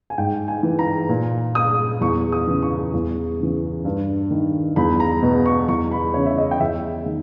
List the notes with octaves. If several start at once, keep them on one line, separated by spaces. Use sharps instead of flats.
G#5
G#2 G5
G#5
E3
A#5
A#2
D#6
E2 C#6
D#6
C#3 E3
C#6
E2
C#3 E3
G2
D#3
E2 B5
A#5
B2
C#6
E2 C#6
B5
C#3 E3 C#5
E5
D#5
G5
E2 E5
D#3